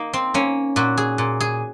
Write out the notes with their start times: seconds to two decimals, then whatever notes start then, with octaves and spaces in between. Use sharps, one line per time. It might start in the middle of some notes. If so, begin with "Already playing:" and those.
Already playing: A#3 D#4
0.13 C4
0.34 A#3 C#4
0.76 A#2 F#4
0.98 G#4
1.18 A#2
1.40 G#4